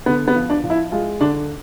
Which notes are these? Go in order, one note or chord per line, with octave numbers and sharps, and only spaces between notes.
D3 B3
B3
F3
D4
F3
E4
G#3 F4
D3 D4